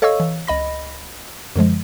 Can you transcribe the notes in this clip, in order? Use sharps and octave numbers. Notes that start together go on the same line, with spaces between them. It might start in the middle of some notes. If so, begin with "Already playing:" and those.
A4 C#5 D#5 F5 C#6 E6
E3
C#2 D#5 B5 A#6
F#2 D3 F3 G#3